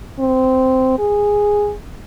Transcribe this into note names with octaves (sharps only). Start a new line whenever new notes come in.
C4
G#4